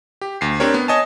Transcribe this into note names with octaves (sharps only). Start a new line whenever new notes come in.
G4
D2 C7
C4 D4 G4 A#4 C#5
B3
C#5 D#5 G#5 A5